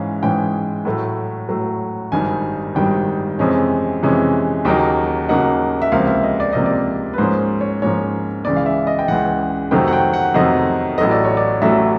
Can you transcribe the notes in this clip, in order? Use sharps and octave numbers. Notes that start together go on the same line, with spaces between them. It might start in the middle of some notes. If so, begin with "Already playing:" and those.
Already playing: G#2 E3 G#3 C#4 F5
G#2 E3 G#3 C#4 G5
A2 F#3 A3
A2 F#3 A3
G#1 G2 D#3 G3 G#5
G#1 G2 D#3 G3 G5
F2 C3 E3 G#3 C#4
F2 C3 E3 G#3 C#4
D#2 C#3 F#3 A#3 D#4 G5
D#2 C#3 F#3 A#3 D#4 F#5
E5
C#2 C3 F3 A#3 F5
E5
D#5
D5
C#2 C3 F3 A#3 D#5
D5
B4
G#2 F3 A#3 C#4 C5
C#5
G#2 F3 A#3 C#4 C#5
C#2 C#3 E3 D5
F5
E5
D#5
G5
C#2 C#3 E3 F#5
F2 C3 D#3 F#3 A3 G5
F#5
G5
F#5
F2 C3 D#3 F#3 A3 D#5
A1 A2 F#3 A3 D#5
D5
C#5
D5
A1 A2 F#3 A3 E5